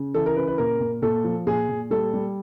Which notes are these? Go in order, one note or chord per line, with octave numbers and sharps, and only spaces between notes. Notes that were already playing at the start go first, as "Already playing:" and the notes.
Already playing: C#3
E3 A4
A#4
C#3 B4
B4
A#2 A#4
A#2
A#2 A4
F3
A#2 G#4
A#2
G3 A4
G3